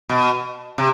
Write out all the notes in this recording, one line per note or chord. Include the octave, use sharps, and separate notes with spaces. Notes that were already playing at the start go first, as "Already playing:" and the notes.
B2
C3